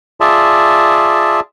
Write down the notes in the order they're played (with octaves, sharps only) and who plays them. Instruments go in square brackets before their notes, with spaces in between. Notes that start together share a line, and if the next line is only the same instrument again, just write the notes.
[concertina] F4 G#4 D5 E5 A5